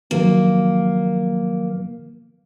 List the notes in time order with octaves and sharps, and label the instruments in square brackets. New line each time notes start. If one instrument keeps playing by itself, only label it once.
[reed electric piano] D#3 F3 F#3 [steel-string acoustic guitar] A#3